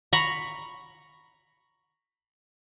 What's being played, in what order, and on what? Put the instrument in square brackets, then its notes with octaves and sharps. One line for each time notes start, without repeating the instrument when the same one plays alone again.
[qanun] A#5 B5 C#6